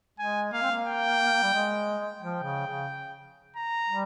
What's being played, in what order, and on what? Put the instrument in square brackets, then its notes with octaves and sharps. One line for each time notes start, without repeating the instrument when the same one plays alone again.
[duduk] G#3 [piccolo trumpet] G#5
[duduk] A#3 [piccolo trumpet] F5
[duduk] C4
A#3
[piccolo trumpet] G5
[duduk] G3
G#3
[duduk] F3 [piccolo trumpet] G5
[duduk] C#3
C#3
[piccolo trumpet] A#5
[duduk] G3